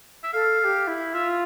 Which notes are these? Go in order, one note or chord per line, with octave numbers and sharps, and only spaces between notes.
E5
A4 F5
A4
G4
E4
F4 E5